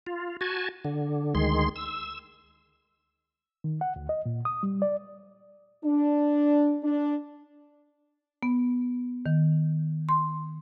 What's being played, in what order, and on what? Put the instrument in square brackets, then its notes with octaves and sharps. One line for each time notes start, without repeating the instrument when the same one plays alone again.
[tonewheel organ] F4
F#4 G#5 A5
D3
D2 D#3 G#3 C6
E6
[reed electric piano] D#3
F#5
D2
D#5
A#2
D#6
G3
D5
[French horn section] D4
D4
[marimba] B3
D#3
C6